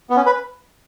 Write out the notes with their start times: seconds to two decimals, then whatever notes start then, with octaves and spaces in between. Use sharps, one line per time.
0.10 B3
0.16 C#4
0.26 B4